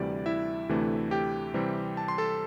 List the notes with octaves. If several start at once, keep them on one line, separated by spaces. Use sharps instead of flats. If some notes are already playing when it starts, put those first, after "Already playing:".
Already playing: D2 C3 E3 G3 D5
E4 E5
D2 C3 E3 A3 D4
G4 G5
C3 E3 G3 C4
A5
C6
A4 A5